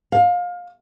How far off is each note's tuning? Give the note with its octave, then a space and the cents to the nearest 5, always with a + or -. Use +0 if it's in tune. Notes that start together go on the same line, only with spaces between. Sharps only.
F5 +25